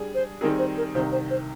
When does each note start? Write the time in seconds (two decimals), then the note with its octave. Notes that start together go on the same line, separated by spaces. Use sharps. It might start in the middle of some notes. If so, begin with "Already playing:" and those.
Already playing: G3 D4 G#4
0.15 C5
0.41 D#3 G3 C4 D#4 G#4 A#4
0.59 C5
0.77 A#4
0.94 C2 C3 D#3 C5
1.12 C5
1.30 C5